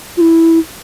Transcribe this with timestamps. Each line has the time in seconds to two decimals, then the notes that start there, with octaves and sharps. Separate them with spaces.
0.17 F4
0.21 E4